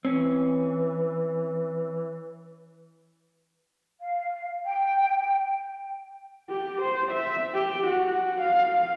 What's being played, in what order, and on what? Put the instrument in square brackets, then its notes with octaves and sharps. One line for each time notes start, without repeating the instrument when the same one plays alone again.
[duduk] E3 [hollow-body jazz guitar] C4 C#4
[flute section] F5
G5
[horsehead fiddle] G4
C5
E5
G4
F#4
F5